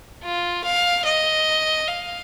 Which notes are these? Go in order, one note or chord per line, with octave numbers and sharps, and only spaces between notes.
F4
F5
D#5
F5